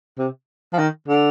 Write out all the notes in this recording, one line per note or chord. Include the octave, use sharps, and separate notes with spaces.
C3
F3
D#3
D3